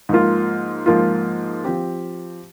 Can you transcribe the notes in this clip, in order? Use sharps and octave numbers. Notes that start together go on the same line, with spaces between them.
G#2 F3 A#3 F4
G#2 F3 A#3 F4
F3 C4 G4